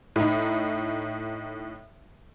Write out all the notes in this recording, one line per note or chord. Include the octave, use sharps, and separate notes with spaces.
A2 D#4